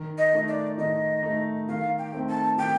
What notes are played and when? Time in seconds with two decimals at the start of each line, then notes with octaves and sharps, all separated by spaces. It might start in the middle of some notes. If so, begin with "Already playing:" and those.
Already playing: D#3
0.18 D#5
0.33 A3 D#4
0.48 D5
0.78 D#3 D#5
1.23 A3 D#4
1.69 D#3 F5
1.98 G5
2.13 A3 C4 D#4
2.28 A5
2.58 D#3 G5